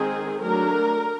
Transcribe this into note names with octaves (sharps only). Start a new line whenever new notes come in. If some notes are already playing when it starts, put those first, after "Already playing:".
Already playing: D#3 G#3 C4 G#4
F#3 A3 D4 A#4